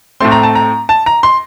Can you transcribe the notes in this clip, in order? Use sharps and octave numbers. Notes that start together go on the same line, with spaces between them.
A2 A3 C4 C6
A#5
A5
A#5
A5
A#5
C6